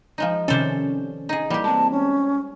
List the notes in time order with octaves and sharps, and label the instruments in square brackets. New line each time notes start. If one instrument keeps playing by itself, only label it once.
[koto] F3 G#3 D#4
[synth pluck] C3 D#3 C#4 [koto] A4 C5 D5
[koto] D#4 G#4
[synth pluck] E3 A#3 [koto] G3 G4
[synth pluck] G#3 C4 [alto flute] A5
[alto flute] C#4